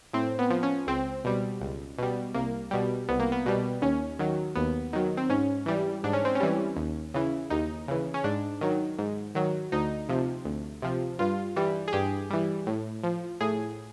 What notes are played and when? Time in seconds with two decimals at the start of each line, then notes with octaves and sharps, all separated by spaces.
0.13 A2 C4
0.39 B3
0.50 F3
0.63 C#4
0.87 C#2 C4
1.25 B2 G3
1.61 C#2
1.98 B2 G3
2.34 C2 A#3
2.71 B2 G3
3.09 C2 B3
3.20 A#3
3.32 B3
3.46 B2 G3
3.82 D#2 C#4
4.19 D#3 F#3
4.55 D#2 B3
4.93 D#3 F#3
5.17 C4
5.29 G#2 C#4
5.66 E3 G3
6.04 G#2 D4
6.13 C#4
6.25 C4
6.35 C#4
6.40 E3 G3
6.77 D#2
7.14 C#3 E3
7.50 D#2 D#4
7.88 C#3 E3
8.14 C#4
8.24 G#2 D4
8.61 D#3 F#3
8.98 G#2
9.35 D#3 F#3
9.72 D2 D#4
10.09 C3 F3
10.45 D2
10.82 C3 F3
11.19 G2 F4
11.56 E3 G3
11.88 G#4
11.93 G2 G4
12.30 E3 G3
12.67 A2
13.04 F3
13.41 A2 G#4